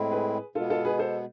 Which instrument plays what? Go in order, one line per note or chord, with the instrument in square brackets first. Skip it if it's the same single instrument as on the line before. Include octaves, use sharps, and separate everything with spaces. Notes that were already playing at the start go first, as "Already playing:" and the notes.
Already playing: [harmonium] A2 G#3 C4 E4
[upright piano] G#4 B4
[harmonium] B2 G#3 B3 [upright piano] F4 A4
[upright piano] F4 A4
G#4 B4
A4 C5